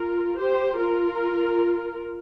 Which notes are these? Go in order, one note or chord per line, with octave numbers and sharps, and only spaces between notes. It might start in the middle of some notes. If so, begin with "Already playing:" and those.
Already playing: F4 A#4
G4 C5
F4 A#4